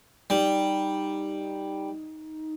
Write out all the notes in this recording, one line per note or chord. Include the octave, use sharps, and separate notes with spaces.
G3 D#4